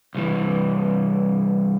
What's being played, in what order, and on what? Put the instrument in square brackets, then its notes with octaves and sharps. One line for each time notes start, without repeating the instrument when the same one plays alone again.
[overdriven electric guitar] C2 E3